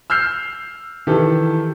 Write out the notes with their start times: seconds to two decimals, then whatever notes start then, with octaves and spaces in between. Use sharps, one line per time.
0.10 E6 F6 G6 C7
1.07 D#3 E3 G4 A4